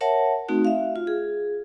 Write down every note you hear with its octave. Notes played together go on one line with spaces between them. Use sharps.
A#4 C#5 E5 F#5 A5
A3 C4 D#4 F#4
E5 F5
F4
G#4